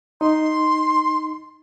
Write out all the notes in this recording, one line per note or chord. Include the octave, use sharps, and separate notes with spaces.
D#4 C6